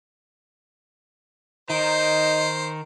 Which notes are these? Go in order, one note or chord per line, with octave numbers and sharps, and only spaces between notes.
D#3 D#4 C5